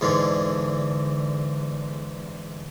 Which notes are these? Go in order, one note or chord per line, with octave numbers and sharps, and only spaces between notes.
E2 G#2 D3